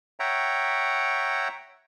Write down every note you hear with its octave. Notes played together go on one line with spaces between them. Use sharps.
C#5 E5 F#5 G5 A#5